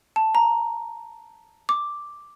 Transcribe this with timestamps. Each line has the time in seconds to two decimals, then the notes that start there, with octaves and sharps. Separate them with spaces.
0.16 A5
0.35 A#5
1.69 D6